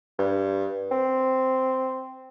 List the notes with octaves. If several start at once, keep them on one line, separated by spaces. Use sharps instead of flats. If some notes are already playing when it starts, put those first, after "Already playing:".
G2
C4